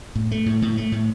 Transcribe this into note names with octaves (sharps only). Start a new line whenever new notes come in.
A2
A3
A2
A2
A3
A2